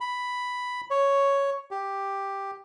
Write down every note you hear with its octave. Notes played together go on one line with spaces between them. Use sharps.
B5
C#5
G4